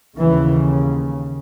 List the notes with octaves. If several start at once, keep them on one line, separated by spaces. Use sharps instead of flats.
D#2 C#3 E3